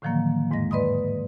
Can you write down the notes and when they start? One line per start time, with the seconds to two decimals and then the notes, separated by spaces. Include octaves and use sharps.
0.02 A2 D3 D#3 F3 F#3 A#3
0.51 E2 G#2 G#3 D#5 A#6
0.71 B4 D5 D#5 B5 C6 D#6